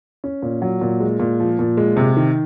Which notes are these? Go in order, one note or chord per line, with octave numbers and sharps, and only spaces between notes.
C#4
A#2
F#3
A#2
G#3
A#2
F3
A#2
G#3
C3
D#3